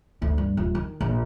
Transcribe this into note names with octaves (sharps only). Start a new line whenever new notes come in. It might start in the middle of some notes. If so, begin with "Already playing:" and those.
D2
G2
D#1
D#3
A#1